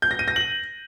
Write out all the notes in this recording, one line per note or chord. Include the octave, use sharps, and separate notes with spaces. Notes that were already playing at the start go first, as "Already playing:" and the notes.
G6
A#6
D#7
A#6
F#7